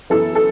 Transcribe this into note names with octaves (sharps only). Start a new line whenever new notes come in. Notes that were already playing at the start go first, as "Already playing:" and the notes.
F#2 E3 B3 E4 A4
A4